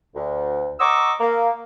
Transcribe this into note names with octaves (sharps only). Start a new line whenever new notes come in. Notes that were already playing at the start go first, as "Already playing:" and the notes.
D2
D#5 F#5 A#5 C#6 D6 E6
A#3